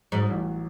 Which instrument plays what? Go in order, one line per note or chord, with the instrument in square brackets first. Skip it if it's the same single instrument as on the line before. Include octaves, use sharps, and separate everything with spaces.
[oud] G#2 [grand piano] F#3
[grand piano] A1